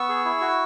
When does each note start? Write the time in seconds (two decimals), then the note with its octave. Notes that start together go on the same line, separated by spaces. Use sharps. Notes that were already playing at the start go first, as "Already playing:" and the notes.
Already playing: B3 C#6 E6
0.09 G#4
0.25 E4
0.41 F#4